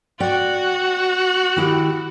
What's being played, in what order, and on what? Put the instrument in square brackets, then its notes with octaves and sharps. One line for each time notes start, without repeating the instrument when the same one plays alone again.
[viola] F#4 [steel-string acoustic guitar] D5 G5
[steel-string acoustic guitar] D#3 E4 G4